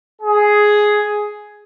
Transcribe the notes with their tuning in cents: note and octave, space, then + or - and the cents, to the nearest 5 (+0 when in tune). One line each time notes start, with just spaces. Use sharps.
G#4 +5